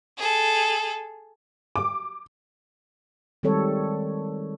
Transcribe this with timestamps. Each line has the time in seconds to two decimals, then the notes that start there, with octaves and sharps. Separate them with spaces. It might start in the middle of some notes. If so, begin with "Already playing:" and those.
0.17 G#4 A4
1.76 D6
3.43 D#3 G3 G#3 C4 A4 C#5